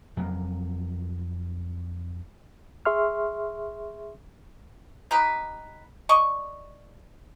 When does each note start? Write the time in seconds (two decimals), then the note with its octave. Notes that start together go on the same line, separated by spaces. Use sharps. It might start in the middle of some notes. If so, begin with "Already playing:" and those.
0.17 F2 F#3 G#3 A#3
2.85 G#4 E5 C6 C#6 F6
5.11 D#4 G4 B4
6.09 D5 D#5 C#6